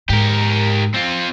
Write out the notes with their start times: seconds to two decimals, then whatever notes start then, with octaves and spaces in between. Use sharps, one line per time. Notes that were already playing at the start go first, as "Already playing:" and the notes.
0.09 G#2 G4 A#4
0.95 C4 F4